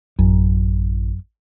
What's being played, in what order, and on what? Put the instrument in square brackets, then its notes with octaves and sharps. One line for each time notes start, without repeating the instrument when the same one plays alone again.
[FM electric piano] A1 [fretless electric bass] F#2